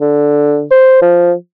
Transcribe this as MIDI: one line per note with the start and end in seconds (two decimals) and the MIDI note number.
0.01 0.64 50
0.71 1.01 72
1.02 1.33 53